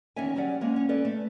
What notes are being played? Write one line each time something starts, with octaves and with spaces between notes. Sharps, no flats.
E2 D#3 C#4 C#5 E5 G#5
F#3 G3 C#4 D5 F#5
F3 G#3 A#3 C#4
C#4
C#4 A4 B4 D5
A3